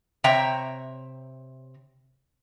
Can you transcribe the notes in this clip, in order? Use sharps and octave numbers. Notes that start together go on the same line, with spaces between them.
C3 C#5 E5 G5 A#5